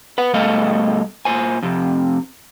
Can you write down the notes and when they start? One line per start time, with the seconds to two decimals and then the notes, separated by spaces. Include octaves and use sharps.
0.18 B4 F#5
0.34 B2 G3 A3 A4 D#5 F5
1.25 A#2 C5 G#5
1.63 F2 C3